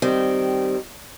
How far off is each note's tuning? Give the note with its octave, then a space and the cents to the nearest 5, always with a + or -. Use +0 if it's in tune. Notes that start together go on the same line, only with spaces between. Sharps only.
D#3 -15 G3 -20 C4 -15